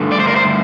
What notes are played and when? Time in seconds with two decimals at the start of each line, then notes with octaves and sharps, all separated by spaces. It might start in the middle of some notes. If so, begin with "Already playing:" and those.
Already playing: G2 D3 A3
0.12 D5
0.20 C5
0.28 A#4
0.36 C5